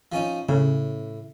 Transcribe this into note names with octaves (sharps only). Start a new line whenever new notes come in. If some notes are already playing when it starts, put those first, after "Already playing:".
F3 C#4 D#4
A2 C#3